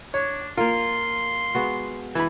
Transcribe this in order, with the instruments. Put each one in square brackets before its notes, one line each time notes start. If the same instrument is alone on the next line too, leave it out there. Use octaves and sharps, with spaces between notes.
[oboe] D4 [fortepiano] C#5
[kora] A#3 A#4 [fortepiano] F4 [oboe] C6
[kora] G#3 B3 F#4
[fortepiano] E3 B5 [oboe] G#5